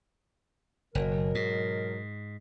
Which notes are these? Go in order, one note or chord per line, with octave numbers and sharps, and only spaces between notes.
F#1 B2 F#3 A#4
G#2